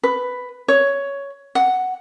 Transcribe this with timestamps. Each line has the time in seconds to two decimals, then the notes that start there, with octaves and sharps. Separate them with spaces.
0.03 B4
0.68 C#5
1.55 F#5